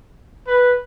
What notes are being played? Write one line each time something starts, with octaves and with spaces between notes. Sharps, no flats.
B4